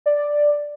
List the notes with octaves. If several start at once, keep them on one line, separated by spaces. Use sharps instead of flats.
D5